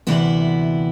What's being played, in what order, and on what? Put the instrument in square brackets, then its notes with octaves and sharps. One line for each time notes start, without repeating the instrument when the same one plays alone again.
[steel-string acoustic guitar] D2 C3 E3 B3 E4